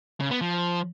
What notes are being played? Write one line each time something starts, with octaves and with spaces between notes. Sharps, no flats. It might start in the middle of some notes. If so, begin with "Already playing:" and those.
C#3
B3
F3